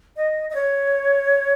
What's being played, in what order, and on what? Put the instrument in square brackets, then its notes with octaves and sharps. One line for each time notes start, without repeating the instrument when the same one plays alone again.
[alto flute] D#5
D#5
C#5